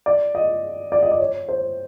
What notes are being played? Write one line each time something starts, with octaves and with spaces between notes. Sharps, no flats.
D5
D#5
D5
D#5
D5
C#5
C5